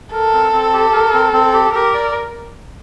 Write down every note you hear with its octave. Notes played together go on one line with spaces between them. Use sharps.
A4 A#4
C4
C4
G4
A#4
C4
C4
G4
G4 A#4
D5